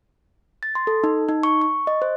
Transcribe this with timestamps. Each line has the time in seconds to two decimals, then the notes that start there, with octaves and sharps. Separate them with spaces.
0.63 A6
0.75 C6
0.87 A4
1.04 D#4
1.29 D#4
1.43 C#6
1.62 C#6
1.87 D#5
2.02 C5